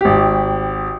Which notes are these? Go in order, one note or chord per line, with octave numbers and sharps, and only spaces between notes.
G#1 G4